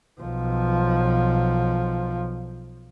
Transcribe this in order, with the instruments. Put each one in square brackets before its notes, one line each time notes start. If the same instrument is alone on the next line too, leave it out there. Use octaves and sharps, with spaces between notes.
[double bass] B1 F3